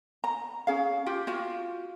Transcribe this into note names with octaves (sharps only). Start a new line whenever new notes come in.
A#5
C#4 G#4 F5
F4 G4
F4 F#4 F5